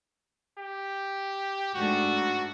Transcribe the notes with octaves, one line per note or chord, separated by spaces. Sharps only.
G4
G#2 A3 D4 F#4